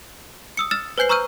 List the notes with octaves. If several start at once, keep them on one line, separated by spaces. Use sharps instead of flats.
D#6 E6 C#7
E6 F6 A6 E7
B4 C5 G#5 G6 C7 F#7
A#5 C#6 E6 F6 G6 D#7